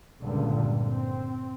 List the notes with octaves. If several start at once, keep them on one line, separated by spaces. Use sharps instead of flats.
C#2 G2 A#2 D3
C4